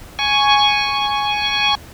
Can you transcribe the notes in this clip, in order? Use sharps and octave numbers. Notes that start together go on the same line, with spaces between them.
G#5 C#6